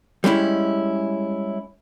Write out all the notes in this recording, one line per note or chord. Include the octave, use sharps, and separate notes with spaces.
G3 G#3 C#4 E4